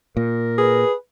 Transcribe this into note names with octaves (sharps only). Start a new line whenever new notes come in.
A#2 A#4
G#4 B4